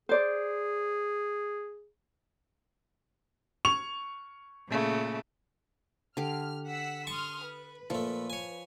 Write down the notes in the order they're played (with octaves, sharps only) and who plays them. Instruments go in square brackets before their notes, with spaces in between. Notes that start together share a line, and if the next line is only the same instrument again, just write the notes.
[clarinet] G#4 [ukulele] C5 D5
[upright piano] C#6 F7
[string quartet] A#2 C#3 A3
[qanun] D3 G4 [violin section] F6
[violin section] F#5 E6 B6
[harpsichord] A5 C#6 [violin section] C6 D#6 F6
[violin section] B4
[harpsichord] A#2 A3 [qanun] F3
[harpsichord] C#5 G#5